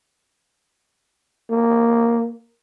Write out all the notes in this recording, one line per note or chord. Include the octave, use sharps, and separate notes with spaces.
A#3